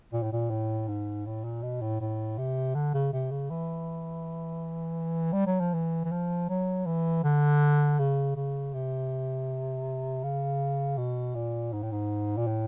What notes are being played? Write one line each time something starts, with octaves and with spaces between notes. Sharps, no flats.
A#2
A2
A#2
A2
G#2
A2
A#2
B2
A2
A2
C3
D3
C#3
C3
C#3
E3
G3
F#3
F3
E3
E3
F3
F#3
E3
D3
C#3
C#3
C3
C#3
B2
A#2
G#2
A2
G#2
A#2
A2